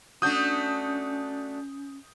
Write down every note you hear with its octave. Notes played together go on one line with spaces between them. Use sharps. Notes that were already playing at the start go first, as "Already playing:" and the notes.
A3 C#4 D4 F#4 D#6 G6